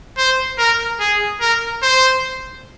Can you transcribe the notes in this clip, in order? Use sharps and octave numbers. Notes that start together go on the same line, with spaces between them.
C5
A#4
G#4
A#4
C5